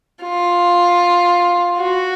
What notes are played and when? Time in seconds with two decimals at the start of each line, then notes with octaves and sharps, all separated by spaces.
0.23 F4
1.78 F#4